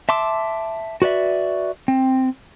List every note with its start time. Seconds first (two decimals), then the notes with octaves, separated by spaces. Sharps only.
0.09 E5 A5 C6 D6 E6
1.02 F#4 B4 D5 E5
1.88 C4